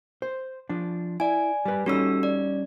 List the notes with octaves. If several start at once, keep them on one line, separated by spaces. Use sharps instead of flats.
C5
F3 D4
E4 D5 G#5
G3 B4
G3 C#4 D#4 F#4 A4 E6
D5